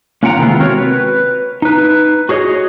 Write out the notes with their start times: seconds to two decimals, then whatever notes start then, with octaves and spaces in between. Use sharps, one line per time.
0.23 A#3 C#4 F4 F#5 G5 A#5
0.38 C3 D#3 G#3 B3 E4 F4
0.60 C4 F#4 A#4 C#5
0.78 B4
1.62 D#4 B4
2.29 F#4 G#4 C#5 D#5